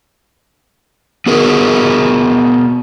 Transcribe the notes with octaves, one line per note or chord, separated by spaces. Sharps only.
B3 F#4 G#4 A#4